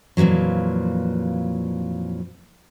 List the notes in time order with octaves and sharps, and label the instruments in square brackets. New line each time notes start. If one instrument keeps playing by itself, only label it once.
[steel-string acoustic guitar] F2 A#2 C#3 E3 F#3